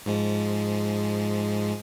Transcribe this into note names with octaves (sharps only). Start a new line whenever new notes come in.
G#2 F3 G#3